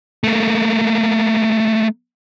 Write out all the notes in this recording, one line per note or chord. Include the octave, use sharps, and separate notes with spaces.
A3 A#3